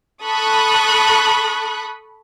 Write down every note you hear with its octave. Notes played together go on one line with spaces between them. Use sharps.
A4 B5 C#6 D#6 F#6